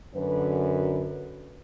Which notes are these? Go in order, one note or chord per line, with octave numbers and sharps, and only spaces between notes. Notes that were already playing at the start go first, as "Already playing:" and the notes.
F#2 D3 B4